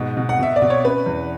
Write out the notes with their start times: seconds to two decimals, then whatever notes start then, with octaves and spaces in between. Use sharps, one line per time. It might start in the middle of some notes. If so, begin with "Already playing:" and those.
Already playing: G#2 B2
0.17 B2
0.29 F#5
0.39 B2 E5
0.56 D5
0.62 B2
0.70 C#5
0.84 C#4 B4
1.06 E2